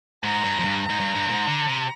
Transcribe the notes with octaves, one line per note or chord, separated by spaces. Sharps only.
G#2 A#5
G2
F2
G2
A#5
G#2
G2
G2
A#2
G#2
D3
C3